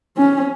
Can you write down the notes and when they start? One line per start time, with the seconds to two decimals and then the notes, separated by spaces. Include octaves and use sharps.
0.17 C#4